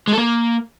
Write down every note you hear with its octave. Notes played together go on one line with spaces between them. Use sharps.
G#3
A4
A#3